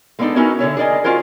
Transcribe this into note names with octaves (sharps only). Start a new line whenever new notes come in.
G#3 A3 B3 D4 D#4 A4
B3 C#4 D#4 E4 F#4 A#4
D3 A4 C#5 E5
G#4 A#4 D5 D#5 G#5
C#4 F4 F#4 A#4 C5